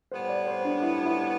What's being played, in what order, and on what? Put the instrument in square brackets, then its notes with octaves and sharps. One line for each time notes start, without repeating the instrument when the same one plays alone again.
[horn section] A2 G3 B3 [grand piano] C5
[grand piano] D5
C5
D4
E4
E4